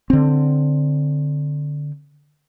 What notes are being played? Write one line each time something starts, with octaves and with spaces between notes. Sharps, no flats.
D3 C4